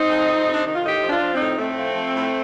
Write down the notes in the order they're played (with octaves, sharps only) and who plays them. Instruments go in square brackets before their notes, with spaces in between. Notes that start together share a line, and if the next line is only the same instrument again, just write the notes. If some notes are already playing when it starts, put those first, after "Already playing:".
Already playing: [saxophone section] C4 D#4
F2
F2
C3
D4
D#3 D#4
F4
A2 D#4 G4
F3
D4 F4
F3
C4 D#4
A2
A2 A3 C4
F3
F3
A2